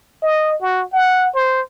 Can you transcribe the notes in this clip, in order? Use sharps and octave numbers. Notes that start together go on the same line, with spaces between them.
D#5
F#4
F#5
C5